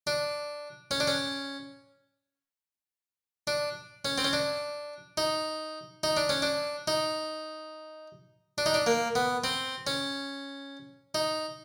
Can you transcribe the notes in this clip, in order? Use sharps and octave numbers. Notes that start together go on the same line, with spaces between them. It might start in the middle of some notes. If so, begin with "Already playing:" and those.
D4
C#4
D4
C#4
D4
C#4
C4
C#4
D4
D#4
D#4
D4
C#4
D4
D#4
D4
D#4
D4
A#3
B3
C4
C#4
D#4